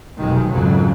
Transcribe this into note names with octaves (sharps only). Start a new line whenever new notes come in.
F1 B1 D#3 G#3
G#1 F2 C#3 F#3